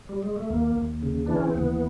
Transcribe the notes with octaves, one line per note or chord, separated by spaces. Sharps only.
G3
G#3
A3
D#2 A#3
D#2
C#3
E3 D4
C#4
C4
D#2 B3